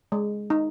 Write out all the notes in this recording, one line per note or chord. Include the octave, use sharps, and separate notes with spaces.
G#3
D#4